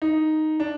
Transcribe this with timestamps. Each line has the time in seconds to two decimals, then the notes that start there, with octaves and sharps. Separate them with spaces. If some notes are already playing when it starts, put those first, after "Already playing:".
0.02 D#4
0.60 D4